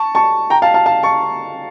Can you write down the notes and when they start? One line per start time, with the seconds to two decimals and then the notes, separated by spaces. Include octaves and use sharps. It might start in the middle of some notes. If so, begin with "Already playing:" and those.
Already playing: A5 C#6
0.15 A5 C#6
0.50 G5 A#5
0.62 F5 A5
0.74 F5 A5
0.86 F5 A5
1.03 A5 C#6